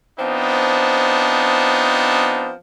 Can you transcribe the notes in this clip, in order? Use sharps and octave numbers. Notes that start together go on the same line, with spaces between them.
F3 B3 C4 D4 D#4